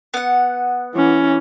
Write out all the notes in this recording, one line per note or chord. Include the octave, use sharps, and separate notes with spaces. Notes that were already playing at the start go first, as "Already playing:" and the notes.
B3 F#5
E3 C#4